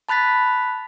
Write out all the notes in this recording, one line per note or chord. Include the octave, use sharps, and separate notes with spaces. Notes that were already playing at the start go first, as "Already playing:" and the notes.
A5 B5 F#6 A6 B6